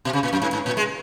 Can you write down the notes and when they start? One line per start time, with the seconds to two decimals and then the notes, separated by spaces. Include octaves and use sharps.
0.05 B2
0.13 C#3
0.23 A#2
0.33 F#2
0.42 G#2
0.53 G#2
0.66 A#2
0.77 G#3